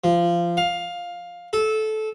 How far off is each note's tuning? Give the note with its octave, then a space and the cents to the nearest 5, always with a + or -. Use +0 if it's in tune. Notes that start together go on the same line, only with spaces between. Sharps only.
F3 -20
F5 +10
A4 -20